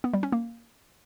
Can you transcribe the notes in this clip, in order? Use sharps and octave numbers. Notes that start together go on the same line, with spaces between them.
B3
G3
C#4
A#3